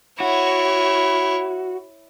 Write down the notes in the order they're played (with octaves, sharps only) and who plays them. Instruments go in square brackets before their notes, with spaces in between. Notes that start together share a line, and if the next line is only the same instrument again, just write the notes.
[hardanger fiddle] E4 C#5 [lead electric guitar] F#4